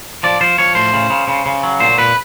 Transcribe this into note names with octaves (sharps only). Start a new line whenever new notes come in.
F3 D5
F3 C5
F3 C#5
A2 C5
C#3
C#3
C#3
C#3
F#3
A#2 C5
A#2 B4